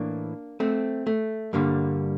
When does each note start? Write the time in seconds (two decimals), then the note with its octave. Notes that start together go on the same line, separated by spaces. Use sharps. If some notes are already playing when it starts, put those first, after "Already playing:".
Already playing: A2 E3 A#3 D4
0.60 A3 C4
1.07 A3
1.53 G2 D3 G3 A#3